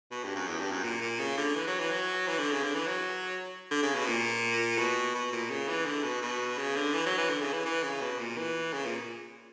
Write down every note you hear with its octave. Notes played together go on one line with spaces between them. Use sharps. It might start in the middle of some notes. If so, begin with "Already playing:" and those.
B2
G2
F#2
E2
G2
F#2
A#2
A#2
C#3
D3
E3
F#3
E3
F#3
E3
D3
C#3
D3
E3
F#3
D3
C#3
B2
A#2
B2
B2
A#2
C#3
E3
D3
B2
B2
C#3
D3
E3
F#3
E3
D3
C#3
E3
E3
C#3
B2
A#2
E3
C#3
A#2